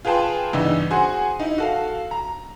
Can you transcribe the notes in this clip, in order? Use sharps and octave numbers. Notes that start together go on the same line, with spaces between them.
F4 G#4 B4 G5 A5 C6
G2 C#3 E3 B3 D#4 E6
F#4 G#4 C5 F#5 G#5 C6
D#4 E4
F#4 A4 F5
A#5